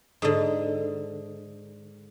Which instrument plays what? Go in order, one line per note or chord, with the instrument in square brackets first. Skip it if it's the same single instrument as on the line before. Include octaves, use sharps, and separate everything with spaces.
[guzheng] G#2 D3